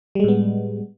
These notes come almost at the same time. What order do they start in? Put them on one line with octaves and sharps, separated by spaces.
G3 G#3 A2 B3